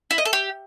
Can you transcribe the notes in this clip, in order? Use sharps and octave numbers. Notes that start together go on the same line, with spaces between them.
E4
D#5
A4
G4